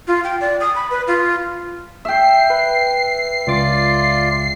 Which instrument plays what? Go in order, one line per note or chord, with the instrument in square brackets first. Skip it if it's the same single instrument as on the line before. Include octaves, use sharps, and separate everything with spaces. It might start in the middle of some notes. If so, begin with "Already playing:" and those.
[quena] F4
G5
D5
D#6
B5
B4
F4
[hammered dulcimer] E5 G5 [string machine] C7
[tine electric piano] B4
[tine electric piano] C#2 D6 [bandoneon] F4 D5